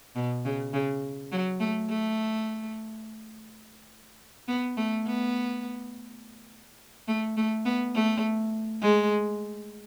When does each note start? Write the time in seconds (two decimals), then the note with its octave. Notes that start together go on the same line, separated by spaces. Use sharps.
0.16 B2
0.45 C#3
0.73 C#3
1.32 F#3
1.60 A3
1.89 A3
4.48 B3
4.77 A3
5.06 B3
7.08 A3
7.37 A3
7.65 B3
7.94 A3
8.81 G#3